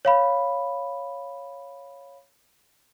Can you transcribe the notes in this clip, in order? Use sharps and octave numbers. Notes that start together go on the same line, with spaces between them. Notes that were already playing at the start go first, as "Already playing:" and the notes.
C#5 F5 B5